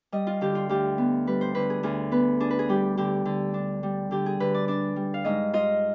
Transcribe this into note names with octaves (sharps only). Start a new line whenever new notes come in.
G3 D#5
F4
D3 G4
F4
D2 G4
B3
G3 B4
C5
D3 B4
G#4
D2 G#4
B3 B4
D4 G#4
B4
G#4
G3 G4
D3 G4
D3
D4
G3
D3 G4
G#4
D3 B4
D5
D4 D5
G3
F5
G#2 D#5
F4 D#5